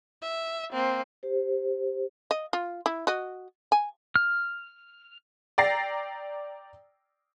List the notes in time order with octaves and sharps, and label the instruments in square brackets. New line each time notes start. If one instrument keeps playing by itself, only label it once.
[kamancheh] E5
A#3 C4
[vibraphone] G4 C5
[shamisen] D#5
F4
E4
F#4 D#5
G#5
[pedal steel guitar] F6
[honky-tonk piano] D5 G5 A#5 A6 A#6 C7